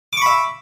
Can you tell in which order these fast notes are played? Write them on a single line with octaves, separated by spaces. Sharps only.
D6 C#6 B5 E5